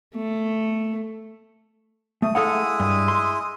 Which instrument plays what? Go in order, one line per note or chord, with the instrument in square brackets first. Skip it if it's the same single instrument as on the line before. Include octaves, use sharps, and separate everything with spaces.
[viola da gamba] A3
[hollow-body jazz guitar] A3 [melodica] D#6
[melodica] G#3 E4 D#6 [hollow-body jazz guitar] A4 F5 F#5
[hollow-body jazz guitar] G2
C6